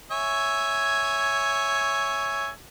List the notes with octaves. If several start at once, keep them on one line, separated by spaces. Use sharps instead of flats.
C#5 E5 G#5